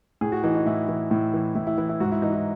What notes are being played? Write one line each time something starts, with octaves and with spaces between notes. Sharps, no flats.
A2 G#4
F#4
E3 D#4
D#4
A2 E4
E3
A2
E3
A2 E4
E4
E3 E4
E4
G#2 F#4
E4
E3 D#4
E4